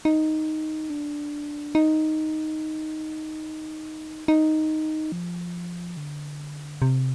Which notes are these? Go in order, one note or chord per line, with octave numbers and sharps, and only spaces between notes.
D#4
D4
D#4
D#4
F3
D3
C3